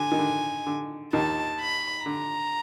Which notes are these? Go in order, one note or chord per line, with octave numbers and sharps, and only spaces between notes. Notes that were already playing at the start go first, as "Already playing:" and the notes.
Already playing: D3 G#5
D#3
D3
D3
D#2 D#3 A5
B5
D3 A#5